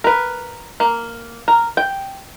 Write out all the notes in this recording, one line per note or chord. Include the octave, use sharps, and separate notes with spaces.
A#4 B4
A#3
A#4
G5